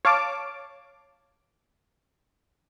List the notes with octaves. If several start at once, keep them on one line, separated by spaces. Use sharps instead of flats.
C#5 F5 A5 D6